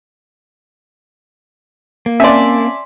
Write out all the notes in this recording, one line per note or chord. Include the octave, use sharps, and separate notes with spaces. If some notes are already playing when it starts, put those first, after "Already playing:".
A#3
C4 C#4 D5 E5 G#5 A5 C6